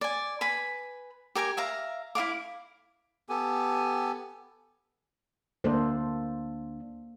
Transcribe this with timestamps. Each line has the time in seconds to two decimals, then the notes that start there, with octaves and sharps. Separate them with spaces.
0.01 D5 G#5
0.41 B4 G#5 B5
1.35 G4 A#4 G#5 D6
1.57 E5 F5 A#5
2.15 E4 D#5 F5 D6
3.29 B3 G4 A4 G#5
5.64 D2 A#3 D4 A4 C5